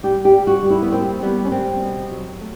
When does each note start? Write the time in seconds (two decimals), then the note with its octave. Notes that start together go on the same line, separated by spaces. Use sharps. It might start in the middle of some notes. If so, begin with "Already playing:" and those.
0.03 G3 G4
0.25 G4
0.33 G3
0.47 F#4
0.62 G3
0.70 E4
0.82 B3
0.92 A#3 C4
1.22 G3 B3
1.45 C#4
1.52 G3 C4
1.82 B2
2.11 F#3
2.40 A3